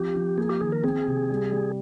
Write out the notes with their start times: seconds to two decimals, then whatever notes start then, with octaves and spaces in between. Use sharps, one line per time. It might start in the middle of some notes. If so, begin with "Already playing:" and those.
Already playing: F3 C4 G4
0.15 F3
0.37 A#3 G#4
0.49 G4
0.60 D#3 G#4
0.72 A#4
0.84 C4 G#4
1.06 C3
1.30 G3
1.52 G3